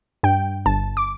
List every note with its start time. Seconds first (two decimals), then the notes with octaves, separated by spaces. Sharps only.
0.23 G2 G5
0.66 G1 A5
0.97 D6